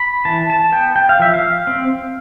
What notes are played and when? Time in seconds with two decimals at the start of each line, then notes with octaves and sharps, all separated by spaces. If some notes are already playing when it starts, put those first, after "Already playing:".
Already playing: B5
0.25 E3 A5
0.50 A5
0.72 B3 G5
0.96 G5
1.09 F5
1.20 F3 E5
1.34 F5
1.67 C4